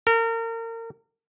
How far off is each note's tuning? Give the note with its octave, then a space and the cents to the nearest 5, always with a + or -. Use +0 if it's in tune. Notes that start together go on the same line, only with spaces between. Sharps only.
A#4 -35